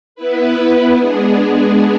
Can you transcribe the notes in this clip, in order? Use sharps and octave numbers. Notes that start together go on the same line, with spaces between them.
B3 E4 B4
G#3 B3 D4 G#4